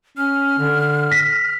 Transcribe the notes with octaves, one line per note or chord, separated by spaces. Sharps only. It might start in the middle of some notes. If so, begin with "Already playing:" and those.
C#4 F6
D3
A#6 B6